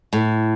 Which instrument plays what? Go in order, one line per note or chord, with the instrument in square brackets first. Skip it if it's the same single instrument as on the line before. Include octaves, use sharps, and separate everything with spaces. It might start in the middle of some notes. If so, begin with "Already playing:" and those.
[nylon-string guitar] A2